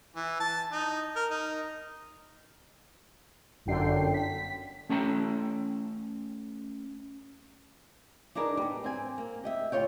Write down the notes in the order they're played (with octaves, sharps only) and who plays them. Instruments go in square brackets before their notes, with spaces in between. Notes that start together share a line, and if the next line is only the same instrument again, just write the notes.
[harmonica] E3
A5
D#4
A#4
D#4
[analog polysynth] G1 F#2 D3 G5 C7
B6
[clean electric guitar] A3 C#4 G5 A#5
[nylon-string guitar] D4 D#4 G#4 A#4 B4
G3 B3
C4 G#5
A#3
G4 D#5 E5
D2 F4 C#5 G5